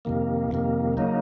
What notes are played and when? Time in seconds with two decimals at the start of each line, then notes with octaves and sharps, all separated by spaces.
0.05 F2 C3 D#3 A#3
0.51 F2 C3 D#3 A#3
0.97 C#3 F#3 A#3 D#4